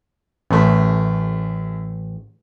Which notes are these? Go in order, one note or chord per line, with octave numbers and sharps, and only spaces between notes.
A1 F#2 A3